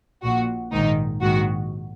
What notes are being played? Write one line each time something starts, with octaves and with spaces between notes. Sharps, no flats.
A#1 A#2 F#4
A#1 G#2 D#3 D#4
A#1 G#2 D#3 F#4